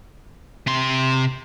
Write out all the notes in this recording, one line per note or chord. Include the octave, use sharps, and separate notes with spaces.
C3 C6